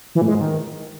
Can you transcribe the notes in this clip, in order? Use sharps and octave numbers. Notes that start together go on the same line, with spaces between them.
E3
A2
G#3
G#2
D#3